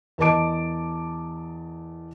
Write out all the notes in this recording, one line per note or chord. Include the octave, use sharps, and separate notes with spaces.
E2 A#4 D#5 A5 D6 D7